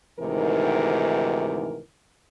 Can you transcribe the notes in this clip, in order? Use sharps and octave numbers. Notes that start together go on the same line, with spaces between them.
D2 G#2 C3 D#3 E3 A#4